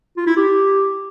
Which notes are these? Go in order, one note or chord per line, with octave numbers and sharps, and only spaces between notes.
F4
E4
G4